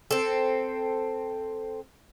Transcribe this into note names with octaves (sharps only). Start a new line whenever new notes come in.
C4 A4